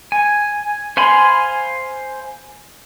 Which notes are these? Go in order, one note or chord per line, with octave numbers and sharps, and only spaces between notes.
G#5
C5 F5 G#5 B5 C6